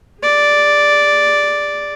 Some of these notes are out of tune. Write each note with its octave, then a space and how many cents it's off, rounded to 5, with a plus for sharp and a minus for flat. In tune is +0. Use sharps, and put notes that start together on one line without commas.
G#4 -40 D5 +0